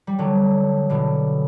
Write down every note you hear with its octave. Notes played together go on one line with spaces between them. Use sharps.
G3
D3 F#3
B2 D3